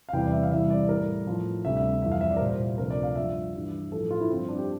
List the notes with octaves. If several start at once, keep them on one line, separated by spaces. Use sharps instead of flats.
F5
E2 C3 E3 G3 G5
D5
E5
F5
C2 C3 E3 G3 E5
D5
A2 G3 A#4
A2 F3
D2 C3 G3 E5
E5
F2 E3 G3 E5
F5
E5
D5
A#4
C2 A#2 G3 C5
D2 C3 F3 A#4
D5
F5
G2 F3 E5
G2 E3 G3
A2 F3 A4
F4
E4
G2 D3 F3 C4
D4
G4